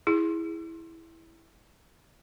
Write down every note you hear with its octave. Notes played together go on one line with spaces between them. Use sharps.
E4 G#4